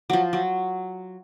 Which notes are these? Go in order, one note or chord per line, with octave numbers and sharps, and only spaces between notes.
F3 F#3
F#3